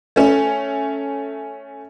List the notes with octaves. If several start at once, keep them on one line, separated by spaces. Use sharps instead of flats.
A3 C#4